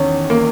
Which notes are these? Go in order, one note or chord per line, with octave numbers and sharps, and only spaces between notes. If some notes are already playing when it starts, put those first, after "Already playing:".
Already playing: E2 D#3 C#4
A#3